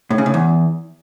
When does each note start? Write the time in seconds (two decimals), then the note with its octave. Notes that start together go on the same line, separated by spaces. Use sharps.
0.10 A2
0.18 C#3
0.26 A2
0.34 E2